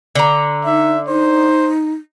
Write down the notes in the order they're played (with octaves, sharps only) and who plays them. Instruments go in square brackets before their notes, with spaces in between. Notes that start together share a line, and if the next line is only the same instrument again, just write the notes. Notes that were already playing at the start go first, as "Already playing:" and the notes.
[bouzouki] D3 A#5
[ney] D#4 [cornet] E5
[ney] D#4 [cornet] C5